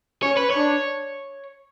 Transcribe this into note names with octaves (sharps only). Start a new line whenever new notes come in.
C#4 C#5
B4
C#5
D4